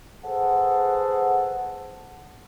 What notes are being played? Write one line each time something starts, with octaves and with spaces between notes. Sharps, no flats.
G#4 A4 B4 C5 F#5